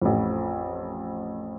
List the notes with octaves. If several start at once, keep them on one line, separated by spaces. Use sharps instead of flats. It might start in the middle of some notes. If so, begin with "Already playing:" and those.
A1 F2